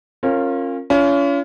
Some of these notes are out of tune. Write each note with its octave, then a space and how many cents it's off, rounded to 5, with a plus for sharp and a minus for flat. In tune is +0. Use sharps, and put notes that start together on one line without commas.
C#4 -35 F4 +0 A#4 -20
C#4 +30 F4 -40